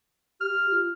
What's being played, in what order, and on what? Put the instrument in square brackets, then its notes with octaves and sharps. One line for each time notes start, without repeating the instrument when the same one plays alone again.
[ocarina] G4 [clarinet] F6
[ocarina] F4